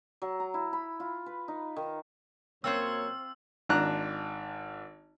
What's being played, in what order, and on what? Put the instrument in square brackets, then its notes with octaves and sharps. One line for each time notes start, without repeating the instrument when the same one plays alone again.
[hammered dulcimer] F#3
A#5
E4
B5
F4
B4
D#4
D#3
[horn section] F#2 C#5 [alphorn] A#3 [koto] C4 F4 C5 [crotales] E6
[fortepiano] G#1 D4 A#5 F#6